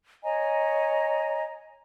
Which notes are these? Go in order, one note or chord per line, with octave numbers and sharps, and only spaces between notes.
C#5 D#5 G#5 A#5